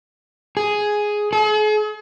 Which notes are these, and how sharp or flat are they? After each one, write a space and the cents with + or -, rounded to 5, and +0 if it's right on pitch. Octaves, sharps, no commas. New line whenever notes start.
G#4 +5
G#4 +45